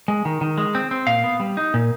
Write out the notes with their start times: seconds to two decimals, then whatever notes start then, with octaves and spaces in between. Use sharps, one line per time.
0.08 G#3
0.25 D#3
0.41 D#3
0.58 G#3
0.75 C4
0.91 C4
1.07 A#2 F5
1.24 B3
1.40 G3
1.57 D#4
1.74 A#2